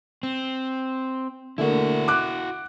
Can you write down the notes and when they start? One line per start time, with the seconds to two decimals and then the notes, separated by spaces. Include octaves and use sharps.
0.23 C4
1.58 D3 A3 A#3 E4 F#4
2.08 D6 F#6